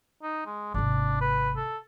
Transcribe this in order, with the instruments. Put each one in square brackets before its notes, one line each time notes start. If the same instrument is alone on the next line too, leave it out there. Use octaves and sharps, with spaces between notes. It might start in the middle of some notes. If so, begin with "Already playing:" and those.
[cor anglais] D#4
G#3
[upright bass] G#1 C3 [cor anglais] D4
[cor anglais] B4
A4